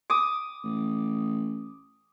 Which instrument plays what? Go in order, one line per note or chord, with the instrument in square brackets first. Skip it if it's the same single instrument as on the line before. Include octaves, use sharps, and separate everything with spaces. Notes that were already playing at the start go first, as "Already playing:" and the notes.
[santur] D6 D#6
[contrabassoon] A1